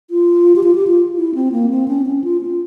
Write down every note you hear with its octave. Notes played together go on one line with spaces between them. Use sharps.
F4
G4
F4
G4
F4
E4
C4
A#3
C4
C#4
C#4
F4
F4